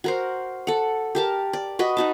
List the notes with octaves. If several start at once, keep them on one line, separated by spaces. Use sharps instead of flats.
F#4 A#4 C5
A4 F#5
G4 A#4 A5
D5
F#4 B4 D#5
D#4 F#4 A5